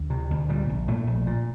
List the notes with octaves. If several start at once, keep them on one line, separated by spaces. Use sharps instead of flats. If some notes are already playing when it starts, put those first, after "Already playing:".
Already playing: D2
C3
D2
A#2 G3
A#1
A#2 A3
A#1
A#2